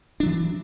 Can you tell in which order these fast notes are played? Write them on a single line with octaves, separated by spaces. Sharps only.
D4 F#3 E3